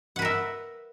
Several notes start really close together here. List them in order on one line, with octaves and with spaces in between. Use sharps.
F#5 B4 A#4 E5